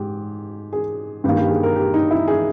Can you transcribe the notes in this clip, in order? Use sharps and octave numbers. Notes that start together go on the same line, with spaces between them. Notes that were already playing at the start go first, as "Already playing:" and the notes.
Already playing: G#2 G4
G#4
G2 D#3 A#3 G4
G4
G#4
A#4
G4
D#4
E4
G#4